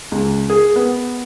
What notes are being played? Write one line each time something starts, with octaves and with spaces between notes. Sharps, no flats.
C#2
G#4
B3